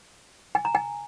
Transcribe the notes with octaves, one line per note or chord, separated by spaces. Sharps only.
G#5
A#5
G#5